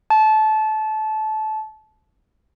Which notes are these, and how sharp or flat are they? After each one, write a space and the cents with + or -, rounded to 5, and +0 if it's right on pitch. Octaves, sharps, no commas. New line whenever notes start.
A5 -25